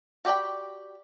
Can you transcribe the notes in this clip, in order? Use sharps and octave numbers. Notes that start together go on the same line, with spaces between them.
F#4 G4 D5 G5 B5